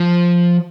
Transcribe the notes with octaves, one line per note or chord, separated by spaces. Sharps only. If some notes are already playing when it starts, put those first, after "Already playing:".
Already playing: F3